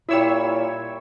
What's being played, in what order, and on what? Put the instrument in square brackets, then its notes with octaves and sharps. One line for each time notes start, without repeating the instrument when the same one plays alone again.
[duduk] A#2 [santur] G3 C#5 E5 [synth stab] E4 E6